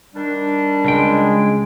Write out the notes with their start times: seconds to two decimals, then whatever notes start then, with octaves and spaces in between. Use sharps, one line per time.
0.15 D#3 G3 D4
0.85 C#2 G#3 G5